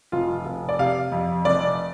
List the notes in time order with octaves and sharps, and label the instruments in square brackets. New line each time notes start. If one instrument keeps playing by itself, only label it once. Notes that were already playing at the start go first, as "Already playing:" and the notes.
[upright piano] F1 F4
F1
D5
C3 F5
F2
F1 D5